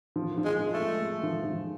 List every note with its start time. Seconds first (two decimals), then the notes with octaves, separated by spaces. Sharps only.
0.16 F3
0.38 F3
0.45 G#3
0.59 F3
0.73 A3
0.80 G#3
1.02 G#3
1.23 F3
1.45 F3